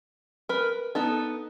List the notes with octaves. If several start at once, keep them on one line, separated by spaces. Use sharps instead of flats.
A#4 B4
B3 D#4 A4